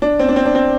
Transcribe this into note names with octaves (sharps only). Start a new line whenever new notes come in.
D4
C4
D4
C4
D4
C4